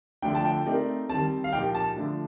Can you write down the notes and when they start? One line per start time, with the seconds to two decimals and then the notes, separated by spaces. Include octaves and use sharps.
0.22 D3 F3 A3 D4 G5
0.35 A5
0.45 G5
0.66 A3 C4 D#4 A#4 D5
1.09 D#3 G3 C4 A5
1.44 F5
1.53 A#2 F3 A#3 D#4 G4 G5
1.75 A5
1.96 D3 F3 A3 D4